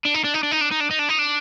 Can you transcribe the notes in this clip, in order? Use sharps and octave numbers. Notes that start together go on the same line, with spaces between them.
D4
D#4
D4
D#4
D4
D#4
D4
D#4
D4
D#4
D4
D#4
D4